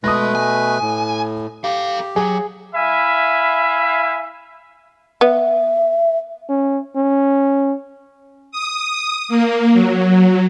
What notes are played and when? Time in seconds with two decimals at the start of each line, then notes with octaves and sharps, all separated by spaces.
0.04 B2 G#3 A3 B4 D#6 A#6
0.35 G#5
0.82 A2
1.64 G4 A4 F5
2.16 F#3 G#4
2.75 E4 E5 F5 G#5 B5
5.21 B3 E5
6.50 C#4
6.96 C#4
8.52 D#6
9.28 A#3
9.73 F#3